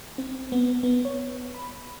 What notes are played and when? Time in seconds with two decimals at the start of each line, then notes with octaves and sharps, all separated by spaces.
0.18 C4
0.52 B3
0.83 B3
1.05 C#5
1.54 B5